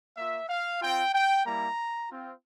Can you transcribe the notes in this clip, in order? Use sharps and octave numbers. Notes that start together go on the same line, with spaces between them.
A#3 F4 E5
F5
C4 F4 G5
G5
G3 A#3 E4 A#5
C4 F4